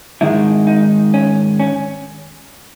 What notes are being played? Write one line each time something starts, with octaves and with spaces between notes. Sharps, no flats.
G#2 D#3 G#3 E4
D#4
C#4
C#4